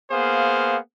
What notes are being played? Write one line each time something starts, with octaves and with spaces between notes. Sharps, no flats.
A#3 B3 G#4 C5 F5